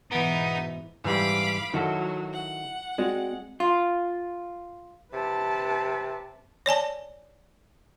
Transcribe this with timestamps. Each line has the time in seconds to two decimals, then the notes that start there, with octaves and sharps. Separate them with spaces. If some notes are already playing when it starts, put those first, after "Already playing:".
0.12 G#2 B2 E3 B3 D#4 A6 D7
1.04 G#2 E3 G3 F5 B5 D6
1.74 D#3 F#3 E4 F#4 A4
2.32 F#5
2.98 G#3 C4 F#4 D5
3.60 F4
5.13 C3 B4 A5
6.66 C#5 D5 G#5 A5